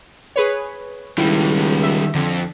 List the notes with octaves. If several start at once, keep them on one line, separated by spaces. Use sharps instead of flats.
G#4 B4 C#5
C#2 D#3 G3 E4
E5
F2 D3